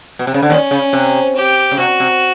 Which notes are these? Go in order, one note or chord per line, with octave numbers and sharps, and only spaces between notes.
B2
C3
C#3
D3
D#2 D#3 C#4
C#3
C3
G4
C#3
C3 F#4
C3